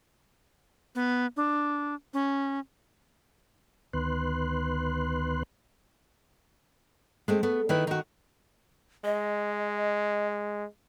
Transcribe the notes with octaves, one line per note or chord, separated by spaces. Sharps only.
B3
D4
C#4
D2 D#3 B3 B4 C6 F#6
G#3 A3 C4
A3 B3
D#3 E4 B4
D#3 F#4
G#3 D#5